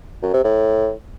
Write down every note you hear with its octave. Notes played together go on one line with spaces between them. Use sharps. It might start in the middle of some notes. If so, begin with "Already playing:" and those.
F#2
C3
A2